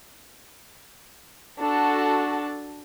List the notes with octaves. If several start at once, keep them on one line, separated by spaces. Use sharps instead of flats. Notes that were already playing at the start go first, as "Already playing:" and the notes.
D4 F#4 A4 A5